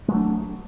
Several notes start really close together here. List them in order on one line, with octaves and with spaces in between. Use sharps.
G#3 F#3 A3 D4